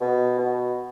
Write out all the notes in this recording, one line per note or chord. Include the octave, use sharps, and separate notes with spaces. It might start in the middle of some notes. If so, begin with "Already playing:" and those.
B2
B2